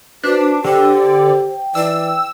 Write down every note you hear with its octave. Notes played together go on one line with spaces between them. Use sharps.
D4 F#4 B4 C5
D3 G4 C5 G5
E3 D5 E6